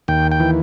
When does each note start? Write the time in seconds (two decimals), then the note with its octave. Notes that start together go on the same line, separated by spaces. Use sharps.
0.08 D#2 G5
0.31 G5
0.40 E3